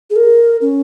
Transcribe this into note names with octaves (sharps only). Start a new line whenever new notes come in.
G#4
A#4
C#4